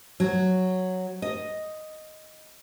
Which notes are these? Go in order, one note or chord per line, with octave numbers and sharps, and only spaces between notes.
F#3
D#5